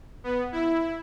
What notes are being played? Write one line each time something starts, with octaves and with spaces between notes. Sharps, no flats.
B3
E4